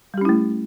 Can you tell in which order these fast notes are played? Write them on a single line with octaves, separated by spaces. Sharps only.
G3 G4 C#4 E4 A3